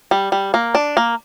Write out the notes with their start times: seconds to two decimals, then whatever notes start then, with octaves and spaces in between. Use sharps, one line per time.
0.11 G3
0.32 G3
0.54 A#3
0.75 D4
0.97 A#3